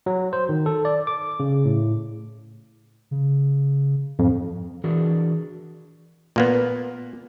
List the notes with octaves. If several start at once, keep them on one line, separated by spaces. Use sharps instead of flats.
F#3
C5
D#3
A4
D5
D6
C#3
A2
C#3
F2 G#2
E3 D4 F#4 G#4 A#4
A#2 A#3 B3